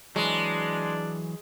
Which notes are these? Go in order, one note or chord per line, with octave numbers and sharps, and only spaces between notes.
E3 F#3 G#3 D4